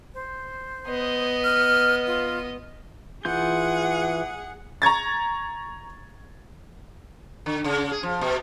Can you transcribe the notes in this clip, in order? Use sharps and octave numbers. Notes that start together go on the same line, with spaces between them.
C5
B3 D#5
F6
F4
E3 F4 G#4 F#5 G6
A#5 C#6 G#6 A6
D3
C#3
G#4
F3
B2